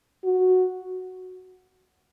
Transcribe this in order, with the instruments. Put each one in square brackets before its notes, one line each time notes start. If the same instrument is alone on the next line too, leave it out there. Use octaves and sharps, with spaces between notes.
[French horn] F#4